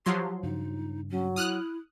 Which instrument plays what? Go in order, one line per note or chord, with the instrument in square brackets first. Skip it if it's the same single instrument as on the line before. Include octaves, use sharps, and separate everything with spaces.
[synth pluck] F3 F#3 C6 [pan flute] G4
[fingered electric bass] G2 C#3 D4 [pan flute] D#4
[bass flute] F#3 [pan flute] C#4
[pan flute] E4 [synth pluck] D#6 F6 F#6